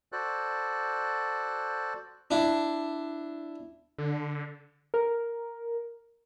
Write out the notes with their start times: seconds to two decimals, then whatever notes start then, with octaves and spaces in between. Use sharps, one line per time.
0.12 F#4 A4 C5 D5 F#6
2.31 D4 E4
3.98 D3
4.94 A#4